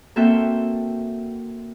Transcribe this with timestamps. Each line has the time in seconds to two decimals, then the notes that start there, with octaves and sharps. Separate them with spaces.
0.16 A#3 C4 F#4 A4 E5 G5